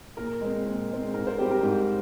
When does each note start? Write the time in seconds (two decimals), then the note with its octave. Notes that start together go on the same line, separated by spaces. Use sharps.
0.17 A#2 A#4
0.41 G#3 C4
0.65 A#2
0.90 G#3 C4
1.14 G#2 A#4
1.27 C5
1.38 G3 C4 G4
1.51 A#4
1.63 G#2